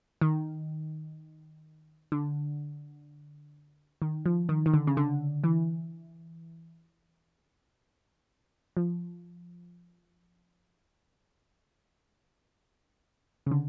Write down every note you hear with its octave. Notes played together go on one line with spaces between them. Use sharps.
D#3
D3
D#3
F3
D#3
D#3
D3
C#3
D3
E3
F3
C#3
D3